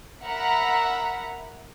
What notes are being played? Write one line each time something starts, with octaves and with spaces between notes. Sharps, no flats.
A#4 E5 F#5 A#5 B5